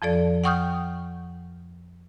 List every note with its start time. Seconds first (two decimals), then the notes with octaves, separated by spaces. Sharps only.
0.02 F2 F3 A4 D5
0.44 F#5 G5 C#6 D#6 F6 G6